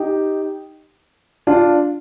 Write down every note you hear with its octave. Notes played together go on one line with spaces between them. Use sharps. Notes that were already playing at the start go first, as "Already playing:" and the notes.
Already playing: D#4 G4
D4 F4